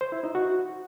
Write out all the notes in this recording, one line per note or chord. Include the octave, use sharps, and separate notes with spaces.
C5
E4
D#4
F#4